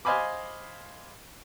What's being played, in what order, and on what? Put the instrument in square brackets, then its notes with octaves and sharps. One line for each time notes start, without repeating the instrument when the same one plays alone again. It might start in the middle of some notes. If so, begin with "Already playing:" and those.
[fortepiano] C5 D#5 F5 G#5 B5 D6